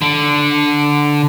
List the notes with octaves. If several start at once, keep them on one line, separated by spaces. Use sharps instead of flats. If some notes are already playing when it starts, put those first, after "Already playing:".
D3